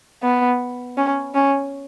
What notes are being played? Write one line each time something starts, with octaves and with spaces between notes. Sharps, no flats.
B3
C#4
C#4